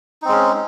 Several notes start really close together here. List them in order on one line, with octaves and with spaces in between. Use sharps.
D#4 C4 G#3 C#4